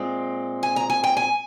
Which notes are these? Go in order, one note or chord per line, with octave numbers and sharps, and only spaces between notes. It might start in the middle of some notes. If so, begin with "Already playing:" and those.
Already playing: A#2 G#3 C4
G#5
A#5
G#5
G5
G#5